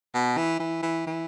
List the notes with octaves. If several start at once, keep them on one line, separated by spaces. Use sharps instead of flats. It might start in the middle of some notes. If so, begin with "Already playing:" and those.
B2
E3
E3
E3
E3